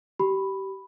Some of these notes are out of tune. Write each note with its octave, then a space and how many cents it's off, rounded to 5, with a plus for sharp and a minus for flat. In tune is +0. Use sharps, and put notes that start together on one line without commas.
G4 -25 B5 +0